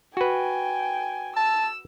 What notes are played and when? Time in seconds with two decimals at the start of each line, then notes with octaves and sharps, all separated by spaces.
0.17 F#4 B4 G5 G#5
1.36 A5 E6